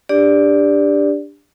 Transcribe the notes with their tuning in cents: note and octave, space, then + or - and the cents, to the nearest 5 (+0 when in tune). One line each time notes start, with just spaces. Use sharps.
D4 +0 G4 +25 D5 -5